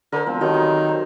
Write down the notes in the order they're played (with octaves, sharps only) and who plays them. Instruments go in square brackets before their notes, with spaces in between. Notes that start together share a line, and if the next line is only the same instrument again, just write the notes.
[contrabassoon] D3 [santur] A#4 C5
[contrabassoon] E1 [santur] F3 C4
[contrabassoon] D#3 [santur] F#3 G3 A3
[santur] D#4
C5